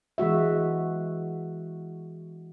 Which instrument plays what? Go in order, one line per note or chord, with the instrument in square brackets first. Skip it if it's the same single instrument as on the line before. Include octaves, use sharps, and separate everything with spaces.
[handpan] E3 G#3 F#4 E5